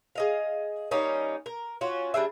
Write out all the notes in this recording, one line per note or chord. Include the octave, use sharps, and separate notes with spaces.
G#4 D#5 F5
G3 A#3 C#4 D#4
A#4
C#4 F4 F#4
G3 D4 G#4 E5